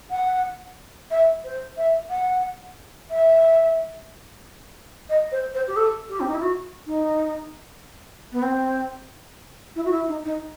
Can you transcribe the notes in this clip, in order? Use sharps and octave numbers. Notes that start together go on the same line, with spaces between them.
F#5
E5
C5
E5
F#5
E5
D#5
C5
C5
G4
A4
G4
C4
D#4
E4
F#4
D#4
B3
C4
E4
F#4
E4
D#4
D#4